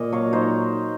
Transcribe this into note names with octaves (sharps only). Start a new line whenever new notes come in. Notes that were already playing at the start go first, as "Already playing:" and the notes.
Already playing: A#2 D#5
F#3 C#5 F5
D#4 C5 D#5